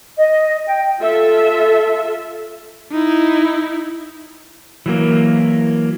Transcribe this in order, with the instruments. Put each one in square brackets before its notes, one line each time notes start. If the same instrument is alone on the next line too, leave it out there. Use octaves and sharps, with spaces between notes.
[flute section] D#5
G5
[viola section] F4 A4 E5
[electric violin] D#4 E4
[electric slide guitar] E3 F#3 A#3